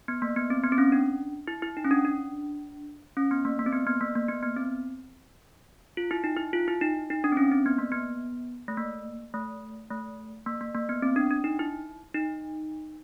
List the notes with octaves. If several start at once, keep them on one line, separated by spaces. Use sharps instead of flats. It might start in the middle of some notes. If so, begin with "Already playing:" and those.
B3
A#3
B3
C4
B3
C4
C#4
D4
E4
E4
D#4
C#4
D4
D4
C#4
B3
A#3
A#3
C4
B3
B3
A#3
A#3
B3
B3
C4
F4
E4
D#4
E4
F4
E4
D#4
D#4
D4
C4
C#4
C4
B3
A#3
B3
A3
A#3
A3
A3
A#3
A#3
A#3
B3
C4
D4
D4
D#4
E4
D#4